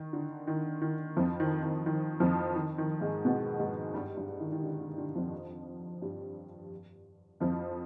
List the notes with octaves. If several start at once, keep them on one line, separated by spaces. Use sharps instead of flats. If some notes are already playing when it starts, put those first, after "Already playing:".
Already playing: D#3
D3
D#3
D#3
F2 F3
D#3
D#3
D#3
F2 F3
D#3
D#3
G#2 G#3
B2 B3
G#2 G#3
G2 G3
G2 G3
D#3
D#3
D3
D3
D3
F2 F3
G2 G3
F2 F3